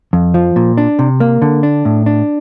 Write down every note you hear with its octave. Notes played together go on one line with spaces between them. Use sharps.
F2
F3
A#2
D4
C3
A#3
D3
D4
A2
D4